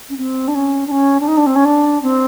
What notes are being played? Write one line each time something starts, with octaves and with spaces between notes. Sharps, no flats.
C#4
C4
D4
C#4
D4
C#4
D4
D#4
D4
C4
C#4
D4
C4